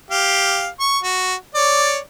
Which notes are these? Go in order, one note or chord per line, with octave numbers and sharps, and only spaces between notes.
G4 F5
C#6
F#4
C#5 D5